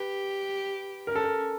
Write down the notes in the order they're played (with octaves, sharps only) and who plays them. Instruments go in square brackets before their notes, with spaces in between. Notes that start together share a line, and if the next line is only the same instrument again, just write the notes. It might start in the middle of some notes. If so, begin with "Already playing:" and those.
Already playing: [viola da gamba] G4 [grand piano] B4
[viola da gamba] C#4 [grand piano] A#4
[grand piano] A4
A#4